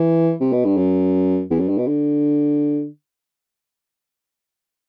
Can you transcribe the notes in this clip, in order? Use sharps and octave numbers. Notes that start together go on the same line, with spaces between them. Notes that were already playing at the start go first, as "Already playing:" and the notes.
Already playing: E3
C3
B2
G2
F#2
E2
F#2
G2
B2
D3